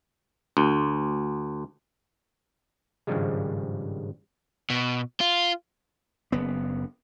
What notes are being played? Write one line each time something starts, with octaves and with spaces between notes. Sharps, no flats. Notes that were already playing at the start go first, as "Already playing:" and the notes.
D2
G#1 G2 C#3 F3 G3 G#3
B2
F4
F#1 B3